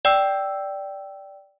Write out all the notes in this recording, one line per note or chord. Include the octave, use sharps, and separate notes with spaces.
D5 G5 E6